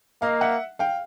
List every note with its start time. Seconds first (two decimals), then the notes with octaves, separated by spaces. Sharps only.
0.22 A#3 D#5 F5
0.41 E5 F#5
0.79 F5 G5